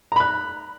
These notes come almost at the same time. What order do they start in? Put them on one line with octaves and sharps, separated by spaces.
A#5 B5 F#6